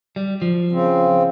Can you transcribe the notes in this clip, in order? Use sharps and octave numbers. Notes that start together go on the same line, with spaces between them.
G3
F3
C#3 C4